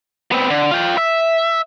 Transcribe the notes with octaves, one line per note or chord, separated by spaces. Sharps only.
B3 C4
D3
F4 G5
E5